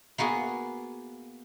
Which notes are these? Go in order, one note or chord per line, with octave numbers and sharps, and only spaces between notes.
A#3 B3 F#4 G#4